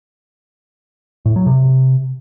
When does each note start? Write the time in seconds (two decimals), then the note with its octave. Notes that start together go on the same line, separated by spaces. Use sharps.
1.26 A2
1.36 F#3
1.46 C3